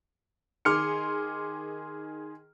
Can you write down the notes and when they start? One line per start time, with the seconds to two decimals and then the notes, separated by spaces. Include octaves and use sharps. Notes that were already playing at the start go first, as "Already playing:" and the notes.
0.65 D#3 G#4 C6 D6 F6 C#7